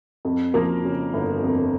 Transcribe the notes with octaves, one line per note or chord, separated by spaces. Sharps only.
F2
F3 A#3 A#4
C#3
G1
F2